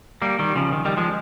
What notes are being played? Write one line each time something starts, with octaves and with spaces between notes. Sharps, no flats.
G3 A#3
D#3 G3
C#3 F3
D#3
D#3 G3
F3 G#3